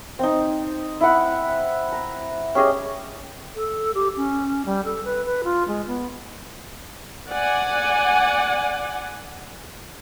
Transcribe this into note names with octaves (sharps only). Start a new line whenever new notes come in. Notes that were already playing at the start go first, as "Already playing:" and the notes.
C4 D#4
E4 F#5
A#5
C#4 G4 G#4 D#5
A4
G4
C#4
G3
A4
B4
B4
F4
G#3
B3
D5 F#5 G#5